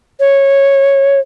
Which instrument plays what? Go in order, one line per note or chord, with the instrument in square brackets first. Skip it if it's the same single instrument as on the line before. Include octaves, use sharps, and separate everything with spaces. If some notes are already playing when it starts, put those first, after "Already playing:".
[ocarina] C#5